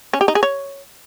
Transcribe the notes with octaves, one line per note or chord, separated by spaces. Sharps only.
C#4
G4
D#4
G#4
C#5